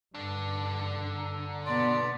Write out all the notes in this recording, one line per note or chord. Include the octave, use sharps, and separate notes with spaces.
G2 D3 D4
A#5
B2 B3 D5 C6